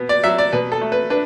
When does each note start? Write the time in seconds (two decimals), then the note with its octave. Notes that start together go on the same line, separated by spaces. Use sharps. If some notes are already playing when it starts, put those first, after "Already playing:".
Already playing: B2 B3
0.09 D5
0.24 F#3 E5
0.38 D5
0.53 B2 B4
0.72 A4
0.81 A3
0.92 B4
1.10 D4 B4